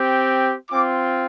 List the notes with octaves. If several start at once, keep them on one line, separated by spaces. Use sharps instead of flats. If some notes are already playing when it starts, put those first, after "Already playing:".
Already playing: C4 G4
C4 F4 D6